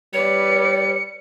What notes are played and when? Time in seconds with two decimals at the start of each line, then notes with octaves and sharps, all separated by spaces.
0.14 G3 B4 C#5 D5 C#7